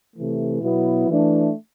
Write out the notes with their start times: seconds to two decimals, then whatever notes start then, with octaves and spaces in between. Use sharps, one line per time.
0.16 C3 E3 A3
0.62 B2 F#3 B3 E4
1.09 E3 A3 D4